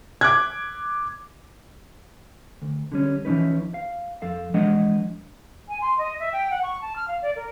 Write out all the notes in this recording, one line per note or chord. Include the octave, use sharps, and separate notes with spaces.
D6 F#6 G#6
D2
D3 G3 C#4
E3 F3 G#3 C#4 D#4 B4
F5
F2 A4 F5
E3 F3 G#3 D4 D#5 F#5
G#5
C6
D#5
E5
G5
F#5
C#6
A5
F6
F5
D5
A#4